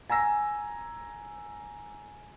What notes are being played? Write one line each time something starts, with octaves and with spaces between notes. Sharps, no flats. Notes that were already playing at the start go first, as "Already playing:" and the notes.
G#5 A#5 E6 A#6